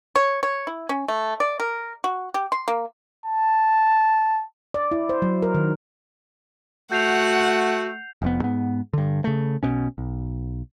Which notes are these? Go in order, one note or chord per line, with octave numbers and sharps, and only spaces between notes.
C#5
C#5
E4
C#4
A3
D5
A#4
F#4
G4
C6
A#3
A5
D5
E4
C5
F#3
A#4
D#3
A3 F#4 F#5 G6 C7 F7
F1 F2 B3
G#2 B3
G2 D3
C#3 A3
B1 B2 C#4
B1